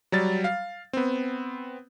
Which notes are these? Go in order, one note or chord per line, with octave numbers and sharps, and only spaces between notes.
F#3 G3 A6
F5
B3 C4